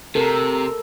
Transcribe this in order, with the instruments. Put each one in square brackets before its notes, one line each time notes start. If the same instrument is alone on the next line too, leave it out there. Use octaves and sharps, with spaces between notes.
[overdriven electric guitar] C3 [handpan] A4 A#4